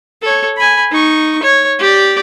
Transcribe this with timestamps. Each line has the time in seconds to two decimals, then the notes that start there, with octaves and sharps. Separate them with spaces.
0.22 A4 C#5
0.57 G#5 B5
0.91 D#4 C#6
1.43 C#5
1.79 G4 D5